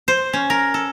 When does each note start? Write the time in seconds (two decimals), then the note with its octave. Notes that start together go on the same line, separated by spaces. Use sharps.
0.08 C5
0.33 C#4
0.50 A#4
0.74 A4